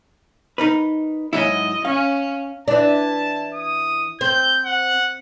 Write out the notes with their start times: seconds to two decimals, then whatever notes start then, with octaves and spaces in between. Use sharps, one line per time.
0.58 D#4 A#4 B4
1.33 G#2 F#3 E4 D#5
1.85 C#4 F5
2.68 E3 D4 A5
3.54 D#6
4.21 C4 G6
4.66 F#5